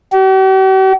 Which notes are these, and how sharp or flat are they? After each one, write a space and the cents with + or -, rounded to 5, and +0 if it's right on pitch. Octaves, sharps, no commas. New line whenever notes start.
G4 -45